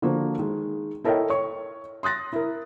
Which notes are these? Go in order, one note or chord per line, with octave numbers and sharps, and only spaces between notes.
D3 F3 A#3 F#4 C5
D#3 G#3
E4 A4 A#4 C#5 D#5 G5
C#5 C#6
C6 D#6 F#6 A6 A#6
E4 A#4